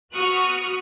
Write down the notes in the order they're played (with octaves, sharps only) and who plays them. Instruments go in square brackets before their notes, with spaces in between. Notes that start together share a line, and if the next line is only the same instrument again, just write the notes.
[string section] B3 F#4 C#6 D#6 F6 F#6